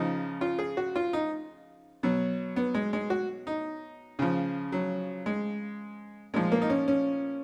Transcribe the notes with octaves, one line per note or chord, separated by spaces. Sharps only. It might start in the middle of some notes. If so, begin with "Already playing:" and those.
Already playing: C#3 F3 D#4
F4
G#4
F#4
F4
D#4
B2 F#3
B3
G#3
G#3
F#4
D#4
C#3 F3
F#3
G#3
A#2 F3 G#3
A#3
D#4
C#4
C#4